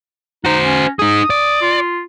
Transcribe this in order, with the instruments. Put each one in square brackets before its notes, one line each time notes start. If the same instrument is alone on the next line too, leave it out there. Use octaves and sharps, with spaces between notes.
[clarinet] D#4 [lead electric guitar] F#4 C5
[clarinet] C#4
[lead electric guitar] D#4 G#4 [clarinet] D#6
[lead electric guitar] D5
[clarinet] F4